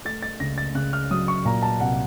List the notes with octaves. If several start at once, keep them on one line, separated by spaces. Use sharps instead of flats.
A3 A6
A6
C#2 A#6
A6
C#3 F#6
F6
F#3 D#6
C#6
A#2 A#5
A5
C2 F#5